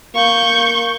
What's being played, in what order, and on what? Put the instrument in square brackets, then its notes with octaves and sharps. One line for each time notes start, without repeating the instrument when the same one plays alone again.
[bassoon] A#3 [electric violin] C#6 G6